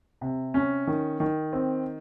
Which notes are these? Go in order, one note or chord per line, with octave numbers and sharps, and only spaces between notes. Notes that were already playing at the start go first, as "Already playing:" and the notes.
C3
C#4
D#3
D#3
C4